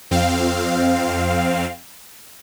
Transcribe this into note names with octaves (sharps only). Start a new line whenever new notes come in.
F2 C4 F5